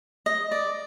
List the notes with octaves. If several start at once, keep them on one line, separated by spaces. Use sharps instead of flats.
D#5
D5